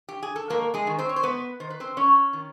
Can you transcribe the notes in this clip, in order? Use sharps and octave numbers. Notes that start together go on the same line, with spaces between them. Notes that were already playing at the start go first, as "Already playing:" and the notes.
G4
G#4
A4
G#2 A#3 A#4
G#3 G#4
D#3
C4 C5
C#5
C5
G#2 B3 B4
D#3 C5
B4
C4 C5
G#2 C#4 C#5
D#3